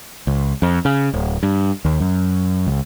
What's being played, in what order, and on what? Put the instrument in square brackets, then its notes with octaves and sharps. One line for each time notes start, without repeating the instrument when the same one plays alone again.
[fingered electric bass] C#2
F2
C#3
D1
G2
D#2
F#2
C#2